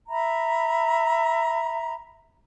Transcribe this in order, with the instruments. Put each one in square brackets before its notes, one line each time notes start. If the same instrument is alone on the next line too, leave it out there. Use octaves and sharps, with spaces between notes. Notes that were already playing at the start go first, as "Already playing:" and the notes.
[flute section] E5 A#5 B5